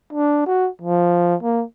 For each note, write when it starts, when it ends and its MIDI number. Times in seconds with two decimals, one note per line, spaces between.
0.13 0.42 62
0.46 0.69 66
0.82 1.35 53
1.43 1.65 58